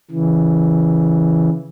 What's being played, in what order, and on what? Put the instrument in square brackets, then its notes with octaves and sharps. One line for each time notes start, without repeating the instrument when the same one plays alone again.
[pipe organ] C#3 E3